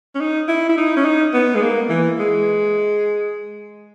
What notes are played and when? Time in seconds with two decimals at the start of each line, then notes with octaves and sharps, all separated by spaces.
0.15 C#4
0.20 D#4
0.48 E4
0.69 E4
0.77 D#4
0.97 C#4
1.05 D#4
1.34 B3
1.55 G#3
1.62 A#3
1.89 E3
2.18 G#3